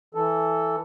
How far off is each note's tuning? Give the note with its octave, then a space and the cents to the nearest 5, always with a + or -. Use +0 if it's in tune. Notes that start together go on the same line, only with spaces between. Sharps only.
E3 +0 A4 +0